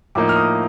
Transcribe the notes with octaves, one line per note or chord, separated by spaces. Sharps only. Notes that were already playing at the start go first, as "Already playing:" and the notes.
A2 F3 A#3 D#4 D6
F6
D#6